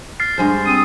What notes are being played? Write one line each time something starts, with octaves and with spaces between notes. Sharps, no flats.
F6 A6 C7
G2 G#3 C5
C4 D#6